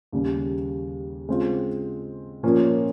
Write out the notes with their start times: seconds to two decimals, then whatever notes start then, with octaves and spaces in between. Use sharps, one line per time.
0.12 D#2 C#3 G3
1.29 C#3 G#3 C4 F4
2.43 A#2 F3 A#3 C#4